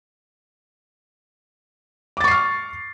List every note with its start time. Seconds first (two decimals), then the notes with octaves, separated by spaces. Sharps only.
2.17 D6
2.21 A6
2.24 C#6
2.28 C7
2.31 F6